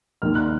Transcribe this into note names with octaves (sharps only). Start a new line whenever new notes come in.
D#2 D#3 A#3 F6
F#6